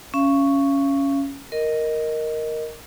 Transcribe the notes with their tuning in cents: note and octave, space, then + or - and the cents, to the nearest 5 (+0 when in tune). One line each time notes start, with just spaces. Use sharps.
C#4 +0 F5 -35
A#4 +0 D#5 +0